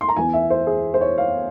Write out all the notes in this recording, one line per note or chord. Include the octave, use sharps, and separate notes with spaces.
C6
A#5
E2 E3 G#5
E5
C5
G#4
C5
C#5
F5